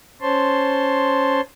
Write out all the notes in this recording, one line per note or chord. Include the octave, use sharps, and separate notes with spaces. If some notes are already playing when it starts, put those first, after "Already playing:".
C#4 C5 C#5 A5 C6